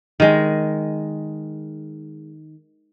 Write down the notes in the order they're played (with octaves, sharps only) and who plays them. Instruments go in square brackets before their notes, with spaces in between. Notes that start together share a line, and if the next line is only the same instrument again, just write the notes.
[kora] D#3 G#3